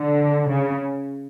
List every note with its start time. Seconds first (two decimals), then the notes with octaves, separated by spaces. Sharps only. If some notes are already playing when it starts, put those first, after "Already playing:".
Already playing: D3
0.50 C#3